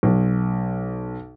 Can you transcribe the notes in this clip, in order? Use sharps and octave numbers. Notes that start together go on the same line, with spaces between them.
B1